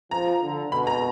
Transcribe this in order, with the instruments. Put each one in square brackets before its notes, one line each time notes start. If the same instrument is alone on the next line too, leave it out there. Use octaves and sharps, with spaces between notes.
[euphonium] F3 [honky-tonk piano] A#5
[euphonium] D3
[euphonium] B2 [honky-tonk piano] B5
[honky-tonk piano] A#5